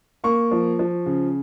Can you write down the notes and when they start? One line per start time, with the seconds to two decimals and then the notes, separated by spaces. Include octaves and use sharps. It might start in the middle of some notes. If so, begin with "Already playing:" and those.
0.24 A#3 C#6
0.51 F3
0.79 F3
1.06 C#3